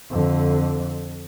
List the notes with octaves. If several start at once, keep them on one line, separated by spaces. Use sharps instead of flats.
F2 D3